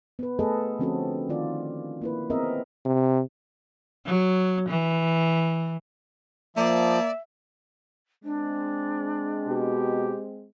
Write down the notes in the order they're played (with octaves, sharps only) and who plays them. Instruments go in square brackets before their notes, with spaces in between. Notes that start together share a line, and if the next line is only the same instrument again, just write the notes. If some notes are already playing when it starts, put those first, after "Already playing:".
[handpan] B3 B4
A3 B3 G#4 A4 B4 D#5
D3 F3 C4 C#4 F#4 A4
D#3 F4 D5
A#3 E4 B4
B3 C4 G#4 A#4 D#5 E5
[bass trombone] C3
[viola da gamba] F#3
E3
[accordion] F3 [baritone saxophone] A#3 [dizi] D5 [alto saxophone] E5
[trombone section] G#3 C4 [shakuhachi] D4
[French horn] B2 [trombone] G4